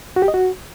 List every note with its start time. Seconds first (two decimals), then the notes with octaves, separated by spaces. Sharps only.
0.16 F#4
0.22 G4
0.28 D#5
0.34 F#4